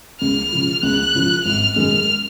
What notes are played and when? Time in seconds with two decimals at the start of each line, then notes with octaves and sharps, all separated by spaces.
0.21 C#2 F6
0.52 C#3 F3
0.83 C#2 F#6
1.15 C#3 F3
1.45 G#1 F6
1.76 F#2 D#3 G#3 F6